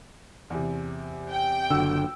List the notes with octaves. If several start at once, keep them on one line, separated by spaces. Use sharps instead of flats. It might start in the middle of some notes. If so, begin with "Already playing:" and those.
E2 C3
G5
F#1 D3 F#4 E6